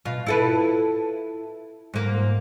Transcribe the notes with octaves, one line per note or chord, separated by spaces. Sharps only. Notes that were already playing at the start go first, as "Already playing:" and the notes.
B2 F4
E4 A4 B4
G#2 A#3